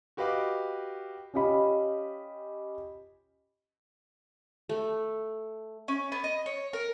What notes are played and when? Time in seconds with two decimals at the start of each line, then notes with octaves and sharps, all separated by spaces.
0.17 F#4 G4 B4 D#5 F5 D6
1.34 C#4 F4 G4 D#5 B5
4.69 A3
5.88 C#4
6.12 B3
6.24 D#5
6.46 C#5
6.73 A#4